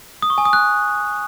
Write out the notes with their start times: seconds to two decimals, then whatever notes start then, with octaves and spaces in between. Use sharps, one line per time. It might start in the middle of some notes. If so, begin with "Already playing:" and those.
0.22 D#6
0.30 C#6
0.38 G#5
0.45 D#6
0.53 F#6